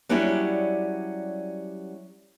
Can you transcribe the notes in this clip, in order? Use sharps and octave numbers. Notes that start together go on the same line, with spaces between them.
F#3 G3 C#4 D4 E4 G4